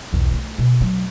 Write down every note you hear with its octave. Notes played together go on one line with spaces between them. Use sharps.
B1 E2
A3
B2
F#3 A3